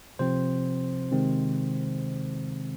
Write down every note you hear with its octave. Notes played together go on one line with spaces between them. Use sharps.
C3 F3 C4 C5
C3 D#3 G#3 C4